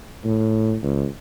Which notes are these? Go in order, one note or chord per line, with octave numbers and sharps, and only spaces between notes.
A2
C#2